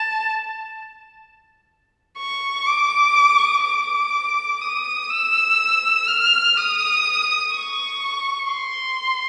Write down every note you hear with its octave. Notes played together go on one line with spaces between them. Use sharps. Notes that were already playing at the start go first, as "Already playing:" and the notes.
Already playing: A5
C#6
D6
D6
D#6
E6
F6
D#6
C#6
C6